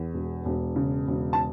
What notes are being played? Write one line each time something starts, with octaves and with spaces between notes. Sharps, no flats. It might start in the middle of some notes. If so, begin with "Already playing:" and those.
Already playing: E2
E1
E1
C#3
E1
A5